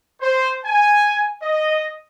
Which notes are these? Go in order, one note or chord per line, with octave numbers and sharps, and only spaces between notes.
C5
G#5
D#5